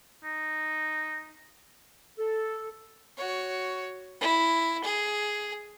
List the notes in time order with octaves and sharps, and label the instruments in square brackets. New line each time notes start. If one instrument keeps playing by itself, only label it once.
[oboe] D#4
[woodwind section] A4
[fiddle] F#4 C#5
E4
G#4